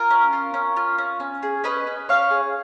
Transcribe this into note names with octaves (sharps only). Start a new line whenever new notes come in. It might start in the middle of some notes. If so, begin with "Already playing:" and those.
Already playing: F4 A#4
C#4
F4
C#4
F4
C#4
C#4
G#4
C#4 B4 D#5
C#4
C#4 C#5 F5
G#4